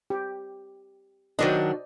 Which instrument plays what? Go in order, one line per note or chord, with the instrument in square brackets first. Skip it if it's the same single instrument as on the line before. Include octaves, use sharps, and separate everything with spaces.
[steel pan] G4
[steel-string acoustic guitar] D#3 F#3 D4 [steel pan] C5 D5 D#5